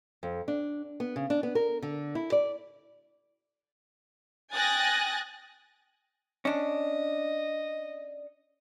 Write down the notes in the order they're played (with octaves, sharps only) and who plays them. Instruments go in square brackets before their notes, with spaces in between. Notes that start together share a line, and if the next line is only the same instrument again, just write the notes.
[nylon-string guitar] F2
D4
B3
C#3
D4
B3
A#4
D3
E4
D5
[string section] G5 G#5 D#6 F#6 A6 A#6
[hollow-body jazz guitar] C#4 D4 [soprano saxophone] D#5